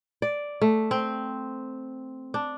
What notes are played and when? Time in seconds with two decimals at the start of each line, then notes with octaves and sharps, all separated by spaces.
0.22 D5
0.61 A3
0.91 C4
2.34 D4